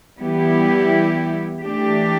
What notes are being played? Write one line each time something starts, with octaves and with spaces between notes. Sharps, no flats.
E3 G3 B3 E4 G4
E3 A3 D4 G4